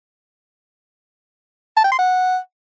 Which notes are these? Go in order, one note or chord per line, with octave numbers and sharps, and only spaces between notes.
A5
G5
C6
F#5